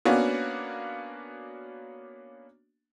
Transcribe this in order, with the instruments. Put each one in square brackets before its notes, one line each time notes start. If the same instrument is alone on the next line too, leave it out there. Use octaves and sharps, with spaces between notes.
[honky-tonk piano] A#3 B3 C#4 D4 F#4